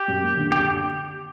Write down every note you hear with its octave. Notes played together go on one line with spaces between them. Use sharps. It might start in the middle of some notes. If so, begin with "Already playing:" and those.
Already playing: G4
F#2
A#3
D3
D4 G4